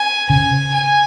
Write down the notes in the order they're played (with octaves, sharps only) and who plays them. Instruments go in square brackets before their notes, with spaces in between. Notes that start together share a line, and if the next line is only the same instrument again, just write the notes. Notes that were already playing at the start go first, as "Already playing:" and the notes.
Already playing: [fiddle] G#5
[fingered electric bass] C#3 [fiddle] G#5
[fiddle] G#5